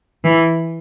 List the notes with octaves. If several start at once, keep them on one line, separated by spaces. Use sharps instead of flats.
E3